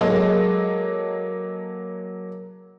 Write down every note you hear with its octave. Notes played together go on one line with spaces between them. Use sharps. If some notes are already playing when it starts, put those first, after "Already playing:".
F#3 G#3 A#3 A4 D#5